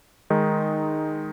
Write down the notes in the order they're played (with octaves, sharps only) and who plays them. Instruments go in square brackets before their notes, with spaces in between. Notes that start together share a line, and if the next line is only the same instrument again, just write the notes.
[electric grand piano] D#3 G#3 D#4